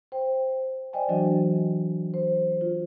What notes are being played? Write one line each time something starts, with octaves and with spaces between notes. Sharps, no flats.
C5 G5
C5 D5 D#5 G5 G#5
E3 F#3 D4 F#4 D#5
C5
F4